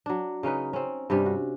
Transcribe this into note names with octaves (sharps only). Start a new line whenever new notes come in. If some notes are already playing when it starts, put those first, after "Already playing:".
F#3 D4
C#3 C#4 D#4 B4
C4 C#4
G2 C3 G3 C#4
F#4